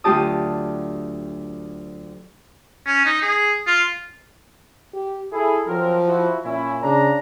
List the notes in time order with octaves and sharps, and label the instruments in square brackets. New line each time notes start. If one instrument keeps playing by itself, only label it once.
[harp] D2 F#3 F4 G4 A5 D#6
[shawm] C#4
D#4
G#4
F4
[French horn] G4
[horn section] E4 G#4 [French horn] A4
[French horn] F3 [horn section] F#3 C4 A#4
[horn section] E4 F#4
[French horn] A#2 [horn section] C#4 E4
[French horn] C#3 [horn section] D4 A#5